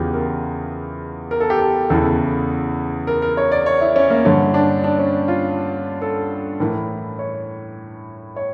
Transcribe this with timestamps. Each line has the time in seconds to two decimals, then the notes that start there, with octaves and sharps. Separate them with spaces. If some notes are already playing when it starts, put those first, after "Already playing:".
Already playing: E2 C#3 E3 F4 G4
0.14 A#4
1.31 A#4
1.40 A4
1.50 G4
1.59 A4
1.90 E2 C#3 E3 A4
3.07 A#4
3.22 A#4
3.37 C#5
3.52 D5
3.66 C#5
3.81 E4
3.96 C#4
4.10 A#3
4.25 G2 D3 C#4
4.54 D4
4.84 D4
4.99 C#4
5.28 F4
6.02 A4
6.60 A2 E3 A#4
7.19 C#5
8.36 C#5